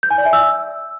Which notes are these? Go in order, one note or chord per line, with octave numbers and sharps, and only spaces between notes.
G6
G#5
D5
E5
E6